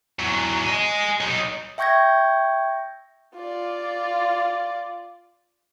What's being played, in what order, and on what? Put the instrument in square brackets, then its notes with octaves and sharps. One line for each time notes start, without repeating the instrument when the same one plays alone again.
[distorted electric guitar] E2 F#3
D#5 G#5
F#3 D#4
[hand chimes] E5 G5 C#6 G6 G#6 A#6
[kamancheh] F4 D5